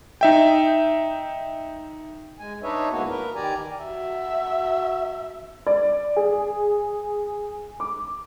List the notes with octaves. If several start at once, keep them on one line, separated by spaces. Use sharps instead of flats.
D#4 E5 G5
G#3 G#5
D4 D#4 B4 C#5 D#5 E5
D2 G#2 A#3 B3 E4 F#4
A#4 B4
D#3 G4 D5 G#5 A#5
F#4 E5
D5
G#4
D6